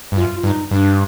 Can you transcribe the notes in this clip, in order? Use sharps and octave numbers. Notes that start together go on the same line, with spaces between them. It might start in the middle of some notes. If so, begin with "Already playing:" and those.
G2
F#2 F4
G2 D#4
G2 D4